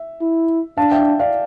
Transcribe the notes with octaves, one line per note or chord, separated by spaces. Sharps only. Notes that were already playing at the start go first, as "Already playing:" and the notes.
Already playing: E5
E4
D4 F5 A5
E5 G5
D5 F5